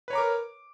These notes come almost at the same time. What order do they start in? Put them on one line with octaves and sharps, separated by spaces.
B4 C#5 A#5 D6 A#4